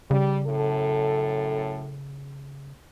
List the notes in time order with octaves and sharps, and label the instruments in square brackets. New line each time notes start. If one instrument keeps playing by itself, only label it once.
[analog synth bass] C#3 [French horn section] G3
[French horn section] F#2 A2 A4